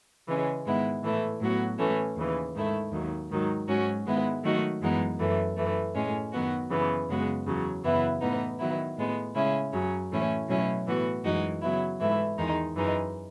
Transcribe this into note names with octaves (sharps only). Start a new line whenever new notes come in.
C#3 E3 G#3 C#4
G#2 D#3 G#3 B3 E4
A2 E3 A3 E4
A2 F#3 B3 F#4
A2 E3 A3 C#4
D#2 C#3 E3
G#2 D#3 A3 E4
D#2 D#3 F#3
G#2 D#3 F#3
G#2 F#3 C#4 F#4
G#2 D#3 G#3 B3 E4
D#3 F#3 A3 D#4 F#4
F#2 E3 G#3 B3 D#4
F#2 E3 A3
F#2 E3 A3
A2 G#3 C#4
F#2 D#3 F#3 B3 F#4
F#2 C#3 E3 B3
F#2 C#3 G#3 B3 F#4
E2 C#3 F#3
F#2 C#3 E3 B3 E4
A2 E3 B3 D#4
D#3 F#3 B3 E4
A2 G#3 B3
C#3 G#3 C#4 E4
F#2 C#3 F#3 C#4
A2 E3 A3 C#4 E4
B2 F#3 A3 C#4 E4
A2 E3 B3 F#4
F#2 E3 G#3 D#4 F#4
C#3 F#3 B3 E4
G#2 E3 A3 E4
E2 D#3 G#3 D#4
F#2 E3 G#3 D#4